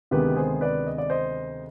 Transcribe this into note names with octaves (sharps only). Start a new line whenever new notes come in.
D2 C3 D#3 G#3 B3 G4 B4
G#4 C5
B4 D5
D#5
D5
C5 D#5